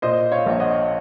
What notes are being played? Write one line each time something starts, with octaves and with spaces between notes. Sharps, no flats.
A#2 C5 D#5
C#5 F5
A#1
D#5 F#5